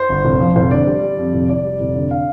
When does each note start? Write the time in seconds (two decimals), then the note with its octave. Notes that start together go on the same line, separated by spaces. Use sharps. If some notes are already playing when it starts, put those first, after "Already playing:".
Already playing: C5
0.09 G1
0.25 F1
0.40 F3
0.56 F1 C5
0.71 D3 D5
0.87 G3
1.03 G3
1.18 F2
1.33 F1
1.49 F1 D5
1.65 G3
1.80 F1
1.95 D3
2.11 F5